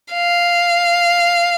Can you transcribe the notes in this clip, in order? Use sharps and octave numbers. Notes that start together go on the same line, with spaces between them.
F5